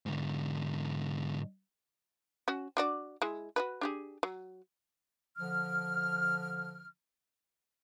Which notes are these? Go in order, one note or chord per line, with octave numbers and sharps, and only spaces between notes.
G#2 D3
C#4 F#4
D4 F#4 D5
G#3 E4
F#4 G#4 B4
D4 G4 G#4
F#3
D3 F3 F6